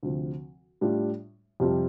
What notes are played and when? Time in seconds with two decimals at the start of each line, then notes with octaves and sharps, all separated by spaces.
0.03 D2 C3 F3 C4
0.81 A2 G3 D4 F4
1.60 F2 C3 G3 C4 F4